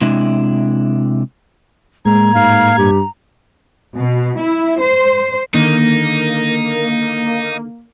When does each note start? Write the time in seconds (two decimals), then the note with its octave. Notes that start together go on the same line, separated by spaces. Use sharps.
0.01 C3 G#3 D4 E4
2.05 A2 G#3 A#3 A#5 G#6
2.35 G#2 F5
2.78 G2 G4
3.95 B2
4.38 E4
4.79 C5
5.54 D3 D#3 A#3 D#4